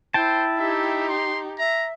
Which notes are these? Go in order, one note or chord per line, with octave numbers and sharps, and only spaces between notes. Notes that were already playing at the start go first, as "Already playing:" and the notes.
E4 C5 G5 A5
D#4 G4 E5
C6
E5 A#5